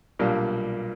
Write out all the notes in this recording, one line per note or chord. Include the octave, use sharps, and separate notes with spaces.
B1 A#2 G3 A#3 D4